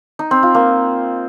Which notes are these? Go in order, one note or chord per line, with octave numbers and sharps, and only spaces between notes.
D#4
C4
F4
A#3